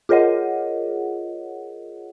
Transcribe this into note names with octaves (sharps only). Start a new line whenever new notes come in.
F4 G#4 A#4 C#5 D#5 F#5